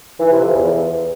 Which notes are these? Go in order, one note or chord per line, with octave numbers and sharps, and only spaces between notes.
E3
C3
F2
E2